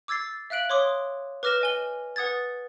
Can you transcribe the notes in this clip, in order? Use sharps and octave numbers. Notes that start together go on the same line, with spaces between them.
D6 E6 G#6 A6 C7
E5 F5 F#6 D7 F#7
C#5 C6 D6 D#6
B4 D6 F6 A#6 E7
D#5 G#5 G7
B4 F#5 D#6 G#6 A6